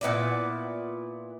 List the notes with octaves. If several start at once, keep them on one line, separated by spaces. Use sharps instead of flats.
A#2 B3 E4 D5